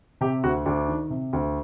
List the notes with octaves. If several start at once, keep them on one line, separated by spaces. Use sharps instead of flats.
C3 G4
D2 F#4
D2 D4
D#3
C3
D2